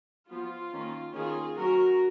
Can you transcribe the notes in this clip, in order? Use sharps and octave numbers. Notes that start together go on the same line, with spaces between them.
F3 B3 F4
D#3 A#3 C#4
D#3 A#3 C#4 F4 G#4
F#3 C#4 F#4 A#4